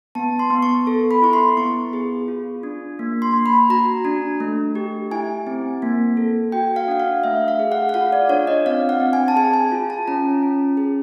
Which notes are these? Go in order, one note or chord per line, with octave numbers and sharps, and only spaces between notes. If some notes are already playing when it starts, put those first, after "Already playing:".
B3 A5
C6
B3
C#6
A4
B5
E4 C#6
C6
B3 C#6
G#4
F4
D4
A#3
C6
A#3
B5
F#4 A#5
D4
A3
G4
E4 G#5
C4
A#3
A4
F#4 G5
F5
D4 F#5
F5
A3 E5
F5
G#4
F#5
F#5
F4 F5
D5
D4 C#5
D#5
C4 F5
F#5
C4
G#5
A5
G#4 G#5
G#5
F4
A5
C#4 A#5
C#4
G#4